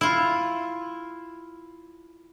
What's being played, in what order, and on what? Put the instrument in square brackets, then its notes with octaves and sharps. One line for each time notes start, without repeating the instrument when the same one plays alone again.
[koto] E4 F4